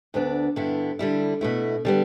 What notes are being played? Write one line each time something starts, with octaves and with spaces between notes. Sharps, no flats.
D2 D3 B3 D4
G2 D3 B3 E4
D3 G3 E4
B2 A3 E4
D3 G3 B3